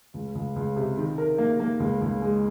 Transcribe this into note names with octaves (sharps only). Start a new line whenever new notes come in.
C#2
C#2
C#2
C3
D#3
A#4
A#3
A#3
C#2
C#2
G#3